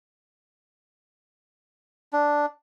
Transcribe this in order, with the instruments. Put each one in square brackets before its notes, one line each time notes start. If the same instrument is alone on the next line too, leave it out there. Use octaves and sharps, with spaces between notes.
[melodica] D4